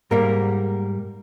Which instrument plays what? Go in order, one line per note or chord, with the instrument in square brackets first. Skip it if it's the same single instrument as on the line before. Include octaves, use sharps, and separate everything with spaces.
[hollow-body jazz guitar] G#2 G3 A#3 A#4